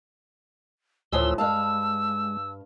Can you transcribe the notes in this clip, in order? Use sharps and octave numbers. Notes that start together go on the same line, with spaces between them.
D2 A2 E3 F3 E6 G7
G2 G#3 F5 A5 E6